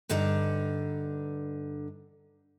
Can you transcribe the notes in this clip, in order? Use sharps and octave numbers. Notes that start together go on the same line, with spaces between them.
G2 D3 D4 D#4 A#5